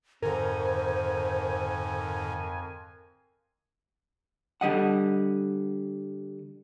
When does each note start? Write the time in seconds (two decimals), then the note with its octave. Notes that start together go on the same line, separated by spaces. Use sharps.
0.22 F2 G#2 D3 A#4 C5 G#5
4.61 D3 G3 D#5 F#5